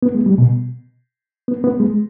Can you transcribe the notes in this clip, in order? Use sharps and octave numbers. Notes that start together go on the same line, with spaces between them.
B3
G#3
G3
B2
B3
B3
G#3